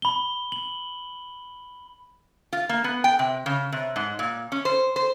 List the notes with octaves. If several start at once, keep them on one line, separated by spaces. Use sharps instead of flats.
B5 G7
F#7
F4
A#3
B3
G5
C3
C#3
C3
G#2
A#2
C#4
C5
C5